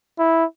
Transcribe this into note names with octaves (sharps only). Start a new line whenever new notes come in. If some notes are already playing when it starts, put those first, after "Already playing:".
E4